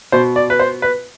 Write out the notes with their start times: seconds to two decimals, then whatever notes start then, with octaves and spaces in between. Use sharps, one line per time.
0.12 B2 C5
0.36 D5
0.50 B4
0.59 C5
0.82 B4